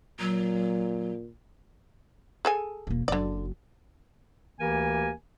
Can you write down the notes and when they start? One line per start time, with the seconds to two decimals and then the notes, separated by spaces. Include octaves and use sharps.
0.20 A#2 F#3
2.45 G#4 A4 G#5
2.87 E1 A#3
3.08 F#1 D3 F#3 D5
4.60 D2 E3 A#3 G4 A#4 G#5